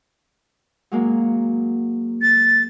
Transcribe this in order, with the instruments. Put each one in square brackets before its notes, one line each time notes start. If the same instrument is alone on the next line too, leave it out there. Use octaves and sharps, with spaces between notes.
[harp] F#3 G#3 A#3
[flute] A6